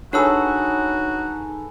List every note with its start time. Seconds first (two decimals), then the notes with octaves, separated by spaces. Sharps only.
0.13 D4 D#4 F#4 G#4 A4 B4 C#5 E6